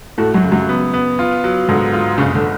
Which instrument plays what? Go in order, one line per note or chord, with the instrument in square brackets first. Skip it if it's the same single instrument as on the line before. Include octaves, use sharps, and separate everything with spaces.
[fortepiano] A2 A3 [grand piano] F#4
[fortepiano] F#2 F#3
[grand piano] C#3
[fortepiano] F#2 F#3
[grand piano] B3
B3
F4
F#3
[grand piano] G#2 [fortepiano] D3
[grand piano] F4
[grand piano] F#1 [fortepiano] C#3
[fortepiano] D3